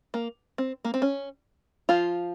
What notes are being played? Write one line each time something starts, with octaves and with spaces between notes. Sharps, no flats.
A#3
C4
A#3
C4
C#4
F3 F4